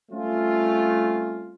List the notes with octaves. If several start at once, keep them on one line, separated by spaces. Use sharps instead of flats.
G3 A3 C4 C#4 F4